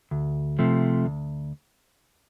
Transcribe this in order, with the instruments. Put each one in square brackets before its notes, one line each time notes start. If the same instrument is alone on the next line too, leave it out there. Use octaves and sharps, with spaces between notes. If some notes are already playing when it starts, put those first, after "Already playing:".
[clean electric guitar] D2
C3 F3 A3
D2